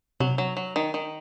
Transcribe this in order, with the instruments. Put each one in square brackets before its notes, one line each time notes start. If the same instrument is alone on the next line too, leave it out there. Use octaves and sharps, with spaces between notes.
[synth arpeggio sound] C3 [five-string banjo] F#3
[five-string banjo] F#3
F#3
D#3
D#3